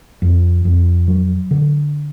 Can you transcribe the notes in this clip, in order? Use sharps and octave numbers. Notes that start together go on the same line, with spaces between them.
F2
F2
F#3
D3